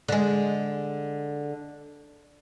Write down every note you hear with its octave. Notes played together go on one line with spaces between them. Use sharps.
D3 G#3